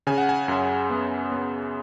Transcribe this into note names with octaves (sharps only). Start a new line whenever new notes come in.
C#3 G#5
F#5
G#5
F#2
B3
B3